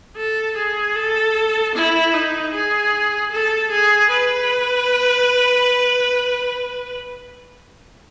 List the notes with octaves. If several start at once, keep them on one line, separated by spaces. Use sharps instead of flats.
A4
G#4
A4
E4
D#4
G#4
A4
G#4
B4